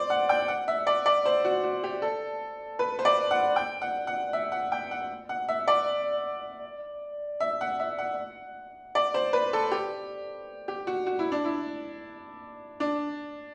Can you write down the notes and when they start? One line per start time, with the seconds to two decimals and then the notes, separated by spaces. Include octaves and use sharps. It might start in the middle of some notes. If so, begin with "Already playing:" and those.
Already playing: C5 D5
0.10 F#5
0.29 G5
0.48 F#5
0.68 E5
0.87 D5
1.06 D5
1.25 C5
1.45 F#4
1.64 F#4
1.84 G4
2.02 A4
2.79 B4
2.99 C5
3.05 D5
3.31 F#5
3.56 G5
3.82 F#5
4.07 F#5
4.33 E5
4.52 F#5
4.72 G5
4.91 F#5
5.29 F#5
5.48 E5
5.68 D5
7.40 E5
7.61 F#5
7.80 E5
7.98 F#5
8.95 D5
9.14 C5
9.33 B4
9.53 A4
9.71 G4
10.68 G4
10.87 F#4
11.06 F#4
11.19 E4
11.32 D4
11.45 E4
12.80 D4